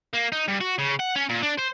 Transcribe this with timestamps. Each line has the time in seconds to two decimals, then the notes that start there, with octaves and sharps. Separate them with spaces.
0.13 A#3
0.32 D#4
0.48 G2
0.61 F#4
0.79 C#3
1.00 F#5
1.16 C#4
1.29 A#2
1.42 D4
1.58 C5